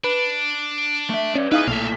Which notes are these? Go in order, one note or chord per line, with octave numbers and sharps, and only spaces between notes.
D4 B4
A3 E5
C#4 B4 D5
D#4 E4 G#4 B4 F5 D#6
B1 A#2 A3 E5 F5